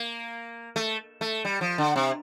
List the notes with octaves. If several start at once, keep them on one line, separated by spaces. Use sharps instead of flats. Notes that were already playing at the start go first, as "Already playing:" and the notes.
Already playing: A#3
A3
A3
G3
F3
D3
C3